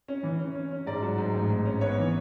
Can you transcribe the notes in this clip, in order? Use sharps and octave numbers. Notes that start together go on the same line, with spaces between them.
C#4
E3
C#4
C#4
C#4
G#2 D5
F#3
G#2
A1
G#2
C#4
B3 C#5
E3